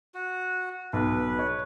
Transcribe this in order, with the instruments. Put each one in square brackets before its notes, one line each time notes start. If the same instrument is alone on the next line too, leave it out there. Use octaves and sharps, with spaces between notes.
[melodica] F#4
[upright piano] B1 [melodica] B4
[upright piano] C#5